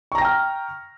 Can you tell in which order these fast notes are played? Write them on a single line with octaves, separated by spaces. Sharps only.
C#6 A#5 A#6 G5 F6